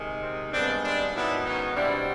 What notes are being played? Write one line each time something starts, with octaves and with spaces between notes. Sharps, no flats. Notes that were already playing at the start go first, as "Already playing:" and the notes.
Already playing: C3 D#3 G#3
C4
G2 D#3 G#3 B3 C4 D4
C4 D4
G#2 D#3 F#3 B3 D4 E4
C#4 D#4
B2 G3 C4 D4 E4